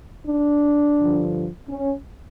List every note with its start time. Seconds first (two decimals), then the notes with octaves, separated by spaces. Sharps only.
0.27 D4
0.99 G2 D3 F3
1.70 C#4